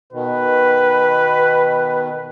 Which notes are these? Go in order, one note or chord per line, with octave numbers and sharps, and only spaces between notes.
B2 D#3 B4